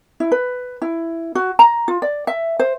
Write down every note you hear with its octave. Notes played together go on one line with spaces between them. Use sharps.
E4
B4
E4
F#4
A#5
F4
D5
E5
C5